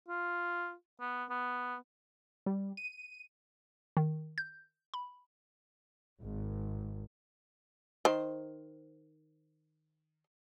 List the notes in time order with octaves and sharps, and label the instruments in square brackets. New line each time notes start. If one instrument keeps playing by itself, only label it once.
[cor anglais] F4
B3
B3
[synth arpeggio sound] G3
D#7
D#3
G6
B5
[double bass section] G#1
[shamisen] D#3 C5